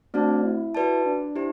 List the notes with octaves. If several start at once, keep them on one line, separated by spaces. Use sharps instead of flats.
A3 C4 D4 F#4 C5
E4
F#4 B4 D5 A5
D4
E4 G4 C5